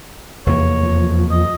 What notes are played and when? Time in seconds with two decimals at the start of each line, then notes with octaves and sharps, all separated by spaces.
0.46 F1 E2 A#3 C#5
0.83 F2
1.31 D#5